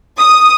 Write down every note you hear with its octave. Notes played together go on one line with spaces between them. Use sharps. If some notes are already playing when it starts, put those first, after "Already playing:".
D#6